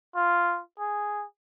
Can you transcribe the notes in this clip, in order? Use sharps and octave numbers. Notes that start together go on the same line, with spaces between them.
F4
G#4